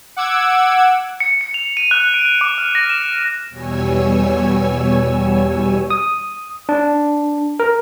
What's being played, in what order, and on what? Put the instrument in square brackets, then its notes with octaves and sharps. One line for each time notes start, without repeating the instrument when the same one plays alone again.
[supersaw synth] F#5 D6 E6 G#6
[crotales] C#7
C#7
F7
D#7
F#6
D7
D6
F6
A#6
E7
[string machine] E2 B2 G3 C#5 G#5 E6
[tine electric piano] D#6
D4
A#4